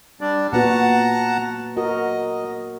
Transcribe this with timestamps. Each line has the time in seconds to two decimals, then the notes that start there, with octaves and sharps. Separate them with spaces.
0.21 G3 D4 D5
0.53 A#2 B3 F#4 F#5 A5 A#5
1.77 F#4 A#4 D#5